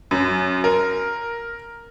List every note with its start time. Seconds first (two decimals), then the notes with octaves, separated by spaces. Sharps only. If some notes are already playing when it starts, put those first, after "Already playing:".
0.11 F#2
0.64 A#4